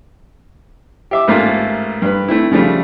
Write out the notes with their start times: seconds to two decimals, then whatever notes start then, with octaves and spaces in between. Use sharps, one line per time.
1.11 G4 E5 D6
1.28 A1 G#2 A3 A#3 F4
2.02 G2 B4
2.28 A3 C4 E4
2.51 C#3 F3 G3 A3